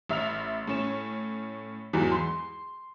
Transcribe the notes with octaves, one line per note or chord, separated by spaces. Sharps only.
A1 E5 F6 F7
A2 C#4 E7
E2 G#2 E3 F#3
C6